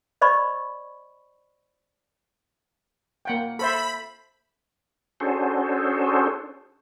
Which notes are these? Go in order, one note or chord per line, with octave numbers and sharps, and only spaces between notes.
C5 D5 D#5 B5 C#6
A#3 F#5 G5
A4 C5 E5 B5
C#4 D4 F#4 G#4 A4 C5